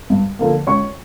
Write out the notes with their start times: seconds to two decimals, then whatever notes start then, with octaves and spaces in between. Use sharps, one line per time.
0.10 G2
0.39 D3 F3 A#3
0.67 C#2 C#5 C#6